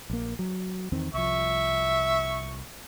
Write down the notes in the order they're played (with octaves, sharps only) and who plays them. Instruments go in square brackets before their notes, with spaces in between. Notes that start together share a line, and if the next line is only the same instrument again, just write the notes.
[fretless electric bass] A#1 A#3
F#3
E2 D#3 C4
[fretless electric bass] C2 F3 [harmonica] E5 C#6